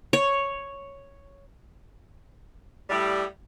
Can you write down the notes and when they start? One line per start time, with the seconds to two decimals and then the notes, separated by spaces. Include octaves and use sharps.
0.13 C#5
2.89 A2 G3